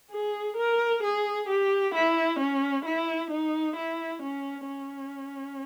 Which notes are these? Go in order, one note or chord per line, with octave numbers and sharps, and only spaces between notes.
G#4
A#4
G#4
G4
E4
C#4
E4
D#4
E4
C#4
C#4